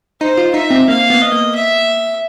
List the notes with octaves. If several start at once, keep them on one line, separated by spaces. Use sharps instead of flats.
D#4 C5
F4
D#4 E5
C4
A#3 F5
B3
D#5
A#3
E5